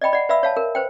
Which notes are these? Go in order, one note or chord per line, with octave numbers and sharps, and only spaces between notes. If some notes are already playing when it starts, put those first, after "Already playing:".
D5 D#5 G5 B5
D5 F#5
B4 D5 E5 F5 B5 E6
C#5 F5 A5
A#4
B4 C5 G5